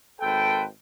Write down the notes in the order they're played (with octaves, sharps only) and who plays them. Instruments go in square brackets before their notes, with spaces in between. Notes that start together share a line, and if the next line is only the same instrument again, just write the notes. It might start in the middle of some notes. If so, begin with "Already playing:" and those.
[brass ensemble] G#1 A4 B4 C5 G5